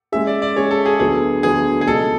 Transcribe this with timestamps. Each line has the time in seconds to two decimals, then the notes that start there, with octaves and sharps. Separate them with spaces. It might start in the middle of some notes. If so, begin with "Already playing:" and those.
0.12 G#3 C#4 G#4 E5
0.27 D5
0.42 D5
0.56 G#3 C#4 G#4 C#5
0.71 A4
0.86 G#4
1.00 D2 D3 F#3 B3 G#4
1.43 D2 D3 F#3 B3 G#4
1.81 G#4
1.87 C#2 B2 F#3 A3 D4 A4